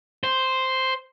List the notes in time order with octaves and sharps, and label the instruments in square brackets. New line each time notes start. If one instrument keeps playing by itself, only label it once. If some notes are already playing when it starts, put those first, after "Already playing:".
[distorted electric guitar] C5